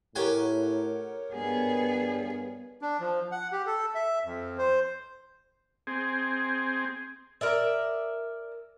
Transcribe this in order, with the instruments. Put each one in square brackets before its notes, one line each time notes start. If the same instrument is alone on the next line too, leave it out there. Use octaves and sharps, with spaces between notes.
[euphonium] A2 [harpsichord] G4 G#5 [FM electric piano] A#4 C#5 F#5
[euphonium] G2 [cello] B3 G#4
[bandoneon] D4
F3
F#5
G4
A4
E5
F2
C5
[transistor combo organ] C4 G#4
[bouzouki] A#4 D5 E5